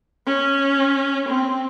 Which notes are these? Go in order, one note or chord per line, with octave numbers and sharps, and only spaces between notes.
C#4
C4